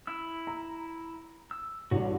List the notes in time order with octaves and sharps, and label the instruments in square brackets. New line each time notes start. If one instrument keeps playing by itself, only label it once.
[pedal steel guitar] E4 E6
[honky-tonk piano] A#5
[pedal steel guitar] E6
[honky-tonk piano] A1 G2 [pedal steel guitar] D3 F#4